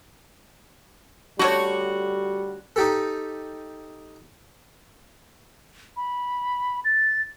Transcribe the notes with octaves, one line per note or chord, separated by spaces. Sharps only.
D3 G3 A3 F#4 C#5
D#4 G4 A4
B5
A6